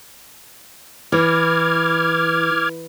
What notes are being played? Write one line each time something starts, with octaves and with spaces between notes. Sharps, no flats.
E3 D6 F6 G#6